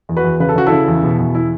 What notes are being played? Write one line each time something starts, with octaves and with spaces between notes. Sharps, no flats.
E2
F#4 B4
E2
C#3 B4
A4
C#3 F#4
E4 A4
C#3
E2
B2
E2
E4